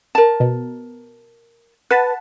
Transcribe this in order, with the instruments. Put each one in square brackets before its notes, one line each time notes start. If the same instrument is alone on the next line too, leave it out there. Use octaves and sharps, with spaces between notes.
[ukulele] A#4 A5
[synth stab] B2
[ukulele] B4 [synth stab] F#5 A5 B5